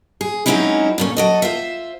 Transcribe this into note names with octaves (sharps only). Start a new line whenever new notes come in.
G#4
F#3 G#3 C4 C#4 D#4 E4
A#2 A3 C#4
F#3 A4 D#5
F4 C5 E5